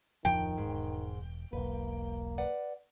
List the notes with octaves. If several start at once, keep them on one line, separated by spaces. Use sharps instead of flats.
D1 F2 D#3 F3 G5
E1 G#2
E1 B1 A#3 B4
B4 D5 F#5